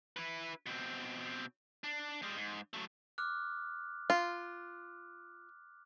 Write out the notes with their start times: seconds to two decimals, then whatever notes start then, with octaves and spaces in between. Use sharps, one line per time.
0.16 E4 B4
0.66 B2 C4
1.84 D4
2.22 G3 G#3
2.36 G#2
2.73 F#3 A3
3.18 D6 F6 F#6
4.10 F4